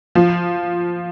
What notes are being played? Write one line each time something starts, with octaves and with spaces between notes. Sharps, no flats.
F3